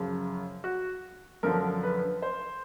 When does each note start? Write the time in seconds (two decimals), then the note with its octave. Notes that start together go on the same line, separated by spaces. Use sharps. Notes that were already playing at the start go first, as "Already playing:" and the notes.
Already playing: F#2 C#3 F3
0.64 F#4
1.43 F#2 D3 F3 A#4
1.83 B4
2.22 C5